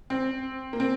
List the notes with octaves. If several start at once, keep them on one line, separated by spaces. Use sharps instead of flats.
C4
A#3
C4